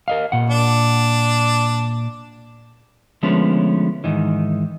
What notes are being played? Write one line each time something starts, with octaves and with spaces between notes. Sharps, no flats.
A#4 D#5 F5
A#2 F#5
D4
D3 F3 G#3 A3 B3 C#4
G#2 D#3 E3